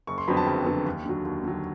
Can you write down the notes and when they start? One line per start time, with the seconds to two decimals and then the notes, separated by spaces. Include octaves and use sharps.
0.07 F#1 C#6
0.18 C6
0.28 F2 D3 F#3 B3 B5
0.37 A5
0.47 F#1 G5
0.66 F2 D3 F#3 B3
0.85 D#2
1.06 D3 F#3
1.25 D#2
1.44 D3 F#3